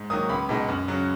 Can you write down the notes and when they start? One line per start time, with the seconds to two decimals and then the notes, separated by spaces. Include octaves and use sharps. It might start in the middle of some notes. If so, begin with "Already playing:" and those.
Already playing: G#2
0.10 D#3 F#3 A#3 D#6
0.29 C#2 B5
0.49 B2 G#3 D#4
0.68 F#2
0.88 C#3 F#3